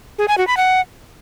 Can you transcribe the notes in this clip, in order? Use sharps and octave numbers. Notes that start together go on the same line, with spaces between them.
G#4
G#5
F#4
B5
F#5